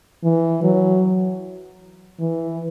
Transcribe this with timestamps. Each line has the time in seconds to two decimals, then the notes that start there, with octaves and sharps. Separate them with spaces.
0.24 E3
0.63 F#3
2.20 E3